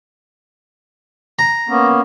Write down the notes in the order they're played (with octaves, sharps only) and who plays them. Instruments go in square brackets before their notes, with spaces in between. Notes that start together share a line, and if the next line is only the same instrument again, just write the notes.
[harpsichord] A#5
[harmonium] A#3 B3 C#4